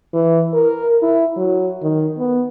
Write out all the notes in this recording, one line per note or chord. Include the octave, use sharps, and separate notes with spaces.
E3
A#4
E4
F#3
D#3
B3